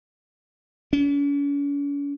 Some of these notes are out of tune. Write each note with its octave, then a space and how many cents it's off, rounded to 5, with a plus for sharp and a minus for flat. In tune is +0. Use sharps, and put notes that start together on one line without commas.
C#4 +45